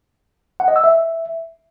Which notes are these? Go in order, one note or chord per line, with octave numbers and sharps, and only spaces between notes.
F#5
D#5
E6
E5